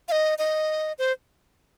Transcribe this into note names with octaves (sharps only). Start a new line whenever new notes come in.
F5
D#5
D#5
C5